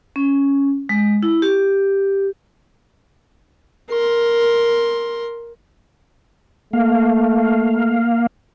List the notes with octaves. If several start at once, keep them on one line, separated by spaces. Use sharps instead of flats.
C#4
G#3
E4
G4
A#4 C6
A3 A#3 F5